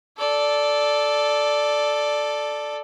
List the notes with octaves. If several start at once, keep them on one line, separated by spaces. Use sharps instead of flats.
A4 D5